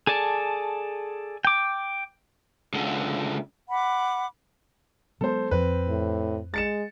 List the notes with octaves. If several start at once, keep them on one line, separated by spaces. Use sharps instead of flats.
G#4 A4 D5 A5
G5 D6
C#2 D3
F#5 B5 D6
F#3 G#3 B3 A4 C5
F2 F3 C4 B4
A2
G#3 A6 C#7 E7